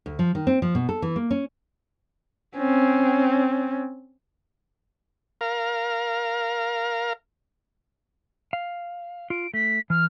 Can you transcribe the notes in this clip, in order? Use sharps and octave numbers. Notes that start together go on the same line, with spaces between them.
D2
F3
D#3
C4
F3
B2
A4
E3
A#3
C#4
C4 C#4
A#4 F5
F5
F4 D7
A3 B6
E3 F6